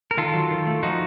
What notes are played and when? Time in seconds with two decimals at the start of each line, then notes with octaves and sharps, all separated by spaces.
0.11 A#4
0.17 D#3 F4 A4
0.34 F#3
0.51 D#3
0.67 A3
0.83 F3 D#4 F#4